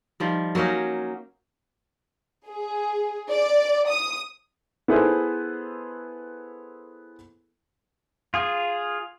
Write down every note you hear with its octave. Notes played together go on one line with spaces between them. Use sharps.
D#3 F3 G3
F#3 A#3 C#4 D#4
G#4
D5
D#6
B3 E4 G#4 A4 B4 C5
F4 G#4